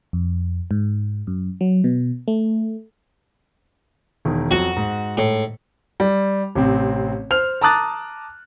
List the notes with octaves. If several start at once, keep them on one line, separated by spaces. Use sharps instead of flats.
F2
G#2
F#2
F#3
B2
A3
E1 D#3
F2 F#3 F#4
G#2
A2
G3
A1 C3 C4
C5 F6 F7
A5 A#5 D6 D#6 F#6 A6